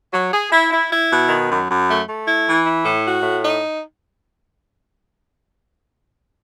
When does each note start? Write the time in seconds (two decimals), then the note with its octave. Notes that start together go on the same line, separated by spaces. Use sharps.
0.13 F#3
0.32 G#4
0.52 E4
0.71 E4
0.91 E4
1.10 B2
1.29 D#3
1.49 F#2
1.68 F#2
1.88 A3
2.07 A3
2.26 E4
2.45 E3
2.65 E4
2.84 A2
3.04 F#4
3.23 A2
3.42 D#4